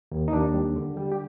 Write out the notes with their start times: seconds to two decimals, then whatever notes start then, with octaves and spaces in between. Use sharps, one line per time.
0.12 D#2
0.28 D#4
0.33 D#2 D4
0.54 G3
0.76 D3
0.97 G3
1.12 G4